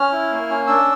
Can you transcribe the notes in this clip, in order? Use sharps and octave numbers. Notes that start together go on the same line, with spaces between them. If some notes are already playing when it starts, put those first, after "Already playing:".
Already playing: C#4 F6
E4
A#3
C#4
D4 E6